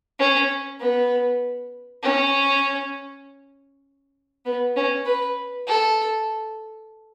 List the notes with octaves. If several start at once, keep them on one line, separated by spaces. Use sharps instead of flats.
C#4
B3
C#4
B3
C#4
B4
A4